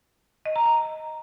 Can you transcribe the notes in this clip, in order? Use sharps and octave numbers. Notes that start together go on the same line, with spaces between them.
D#5
A#5
A#5